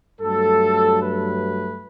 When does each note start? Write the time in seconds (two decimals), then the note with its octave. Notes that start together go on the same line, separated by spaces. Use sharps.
0.21 G2 F#3 A3 A4
1.01 B4